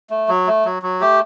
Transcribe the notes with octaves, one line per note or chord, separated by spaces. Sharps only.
A3
F#3
A3
F#3
F#3
A3 G4